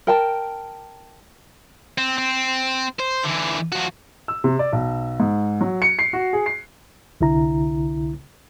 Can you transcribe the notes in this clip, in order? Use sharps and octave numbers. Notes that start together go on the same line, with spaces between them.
A#4 G5 A5
C4
C4
C5
D3 E3
F3 F#4
E6
C3
D5
B1
G#2
F#3
C#7
C7
F#4
G#4
C7
C2 D3 E4 A#5